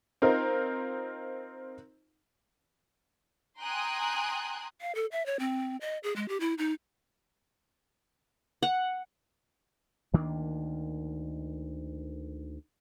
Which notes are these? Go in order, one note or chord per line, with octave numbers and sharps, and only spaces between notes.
C4 D#4 F4 A#4
G5 G#5 A#5 C6 D#6 F#6
F5
A4
E5
C#5
C4
D#5
G#4
G#3
G4
E4
D#4
F#5
D2 D#3 A#3 D4